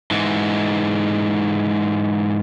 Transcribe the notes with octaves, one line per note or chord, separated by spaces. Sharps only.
G#2 E3